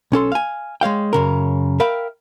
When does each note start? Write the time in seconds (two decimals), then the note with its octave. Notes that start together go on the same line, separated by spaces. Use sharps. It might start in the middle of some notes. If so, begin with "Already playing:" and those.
0.12 B1 C#4 A4 C6
0.32 F5 G#5
0.81 G#3 C#5 F5 G5
1.13 F#2 C#3 A#4
1.80 A#4 E5 F5 G5 B5